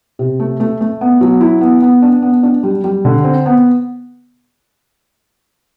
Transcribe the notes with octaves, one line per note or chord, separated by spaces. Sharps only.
C3
A3
A3
A3
B3
F#3
E4
B3
B3
D4
B3
D4
G3
G3
D3
C4
B3